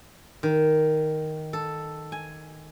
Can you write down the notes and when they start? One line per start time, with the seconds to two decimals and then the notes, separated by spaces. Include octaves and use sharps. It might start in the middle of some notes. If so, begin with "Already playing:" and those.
0.43 D#3
1.53 A4
2.12 G#5